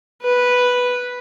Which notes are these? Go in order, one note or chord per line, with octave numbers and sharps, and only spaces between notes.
B4